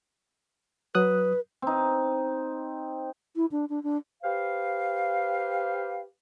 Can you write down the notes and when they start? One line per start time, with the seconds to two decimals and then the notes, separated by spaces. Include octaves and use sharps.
0.95 F#3 B4 D#6 F#6
1.62 C4 D#4
3.36 E4
3.52 D4
3.70 D4
3.83 D4
4.23 G4 B4 C5 F5